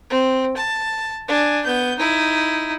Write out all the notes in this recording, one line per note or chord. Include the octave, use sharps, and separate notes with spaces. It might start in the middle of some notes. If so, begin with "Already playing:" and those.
C4
A5
D4 G#5
B3 G6
D#4 E4